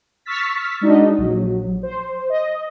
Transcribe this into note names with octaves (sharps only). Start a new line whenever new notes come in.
C#6 E6 F6 A6 B6
G#3 D4 D#4 F#4 D#5
A#1 F#3
C5
D#5